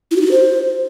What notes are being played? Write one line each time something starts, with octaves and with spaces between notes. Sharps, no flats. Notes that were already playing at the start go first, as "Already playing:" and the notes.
E4
F#4
D#4
F#4
C5